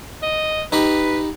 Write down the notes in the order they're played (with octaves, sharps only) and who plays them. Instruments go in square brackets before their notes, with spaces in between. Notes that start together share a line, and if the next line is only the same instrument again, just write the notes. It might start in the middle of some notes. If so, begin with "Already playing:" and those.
[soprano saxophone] D#5
[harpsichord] D#4 G4 B5 [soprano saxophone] B4